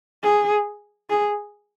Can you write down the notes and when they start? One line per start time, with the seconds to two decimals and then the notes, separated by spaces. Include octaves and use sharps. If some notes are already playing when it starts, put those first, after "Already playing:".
0.23 G#4
1.10 G#4